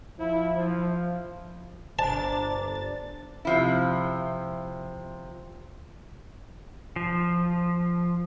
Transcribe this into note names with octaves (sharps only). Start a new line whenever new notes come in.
F3 E4
F3
G1 D4 C5 A5 A#5 A6
C3 F3 E4
F3